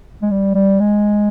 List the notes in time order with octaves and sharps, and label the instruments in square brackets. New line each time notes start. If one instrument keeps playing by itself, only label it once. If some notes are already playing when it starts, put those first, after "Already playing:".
[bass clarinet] G#3
G3
G3
G#3